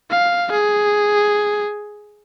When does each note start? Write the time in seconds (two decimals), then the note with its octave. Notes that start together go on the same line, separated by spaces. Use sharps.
0.11 F5
0.52 G#4